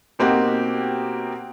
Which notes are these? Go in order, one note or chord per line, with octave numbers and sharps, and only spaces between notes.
B2 A#3 C4 D#4 F#4 G4